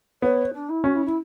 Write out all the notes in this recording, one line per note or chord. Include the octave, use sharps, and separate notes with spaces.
B3 C#5
D4
E4
C#4 F#4
E4
E4